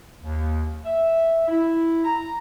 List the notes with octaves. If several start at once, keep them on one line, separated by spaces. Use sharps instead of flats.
D#2
E5
E4
A#5